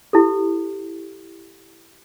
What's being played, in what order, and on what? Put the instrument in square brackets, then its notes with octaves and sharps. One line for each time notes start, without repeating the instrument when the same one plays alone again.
[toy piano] E4 G4 A4